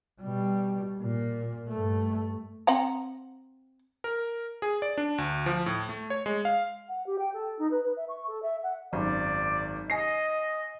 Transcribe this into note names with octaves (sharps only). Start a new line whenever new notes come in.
B2 G3
A#2
G2 A3
C4 F#5 A#5
A#4
G#4
D5
D4
D2
F3
A2
A3
C#5
G#3
F5
F#5
G4
G5
A4
D#4
B4
B4
E5
C#6
A4
E5
F#5
G#1 F#2 D5
D#5 G#5 A#6 C7